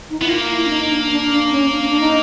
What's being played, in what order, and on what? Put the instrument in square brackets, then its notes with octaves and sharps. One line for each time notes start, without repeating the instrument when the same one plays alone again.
[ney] D#4
[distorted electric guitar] B3 [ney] E4
[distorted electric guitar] A#3 [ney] F4
[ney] E4
D4
D#4
D4
D4
D4
C#4
D4
D4
D#4